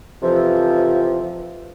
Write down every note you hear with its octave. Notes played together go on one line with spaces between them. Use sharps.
F2 C3 E3 F3